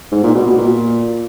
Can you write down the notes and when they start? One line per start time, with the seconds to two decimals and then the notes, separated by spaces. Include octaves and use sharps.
0.12 G#2
0.23 A#2
0.35 B2
0.46 B2
0.58 A#2